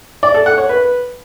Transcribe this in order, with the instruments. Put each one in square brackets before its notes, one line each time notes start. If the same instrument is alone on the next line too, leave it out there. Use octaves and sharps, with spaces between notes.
[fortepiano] D5
A4
F#5
C#5
B4